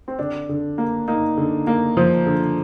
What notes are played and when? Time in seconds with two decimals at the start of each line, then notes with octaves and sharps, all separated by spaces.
0.08 C4
0.19 D3 D4
0.49 D3
0.78 A#3
1.08 A#3 D#4
1.37 D3
1.67 A#3
1.97 F3
2.26 D3